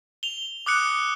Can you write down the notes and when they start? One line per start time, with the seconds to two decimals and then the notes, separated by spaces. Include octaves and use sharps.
0.23 F7 G7
0.66 D6 D#6 F#6 C#7